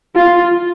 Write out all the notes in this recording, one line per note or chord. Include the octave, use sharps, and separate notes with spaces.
F4